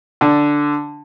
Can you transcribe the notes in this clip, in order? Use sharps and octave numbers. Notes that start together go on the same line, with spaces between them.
D3